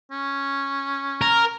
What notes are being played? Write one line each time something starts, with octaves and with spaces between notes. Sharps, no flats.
C#4
A#4